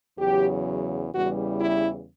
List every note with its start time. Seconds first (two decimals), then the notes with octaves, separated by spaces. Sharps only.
0.17 E2 C#3 F#3 G4
1.13 E2 C#3 E3 G3 F#4
1.59 E4